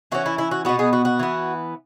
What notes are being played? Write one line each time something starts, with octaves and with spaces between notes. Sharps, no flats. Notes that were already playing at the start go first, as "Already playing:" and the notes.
E3 C#4 F#4
E4
E4
F#4
B2 B3 F#4
G#4
F#4
F#4
E3 B3